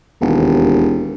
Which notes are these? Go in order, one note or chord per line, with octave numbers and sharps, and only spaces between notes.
E1 D#2